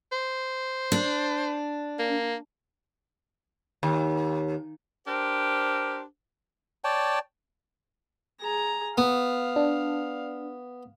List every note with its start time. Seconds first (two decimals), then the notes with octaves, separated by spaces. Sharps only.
0.12 C5
0.92 D4
1.99 A#3
3.83 D#2
5.06 D4 G4 A#4 C5
6.84 C#5 D5 G5 A5
8.41 G#4 A#5
8.98 B3 F5
9.56 D4